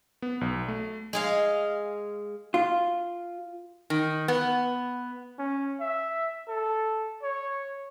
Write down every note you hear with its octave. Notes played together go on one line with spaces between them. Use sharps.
B3
B1
A3
G#3 G#4 F5
F4
D#3
B3
C#4
E5
A4
C#5